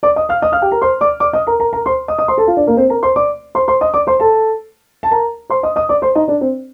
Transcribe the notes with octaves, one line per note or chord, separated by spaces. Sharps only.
D5 D6
D#5 D#6
F5 F6
D#5 D#6
F5 F6
G4 G5
A#4 A#5
C5 C6
D5 D6
D5 D6
D#5 D#6
A#4 A#5
A#4 A#5
A#4 A#5
C5 C6
D#5 D#6
D#5 D#6
C5 C6
A4 A5
F4 F5
D4 D5
A#3 A#4
C4 C5
A#4 A#5
C5 C6
D5 D6
C5 C6
C5 C6
D#5 D#6
D5 D6
C5 C6
A4 A5
A5
A#4 A#5
C5 C6
D#5 D#6
D#5 D#6
D5 D6
C5 C6
D#4 D#5
D4 D5
C4 C5